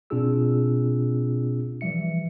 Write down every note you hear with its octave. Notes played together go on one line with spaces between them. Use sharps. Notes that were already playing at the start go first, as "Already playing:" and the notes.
B2 C4 D4 F4 G#4 E6
E3 F3 G3 E5 C#7